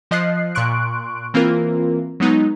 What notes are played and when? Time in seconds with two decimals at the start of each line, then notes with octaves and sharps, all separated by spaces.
0.11 F3 D#5 F#6 C7
0.55 A#2 C6 C#6 F#6 D7
1.34 E3 A#3 C4 F4 A#4
2.20 F#3 G#3 B3 D#4